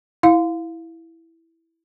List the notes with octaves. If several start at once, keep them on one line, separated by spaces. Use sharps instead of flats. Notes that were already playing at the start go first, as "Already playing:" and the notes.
E4 F5